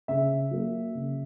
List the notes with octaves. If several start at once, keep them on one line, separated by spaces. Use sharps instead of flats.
C#3 E5
F#3 A#3
C#3